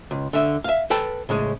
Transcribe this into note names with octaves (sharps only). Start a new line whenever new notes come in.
C#2
D3 E5
E5 F5
A4 B4 G5 A5
A2 C#3 G#3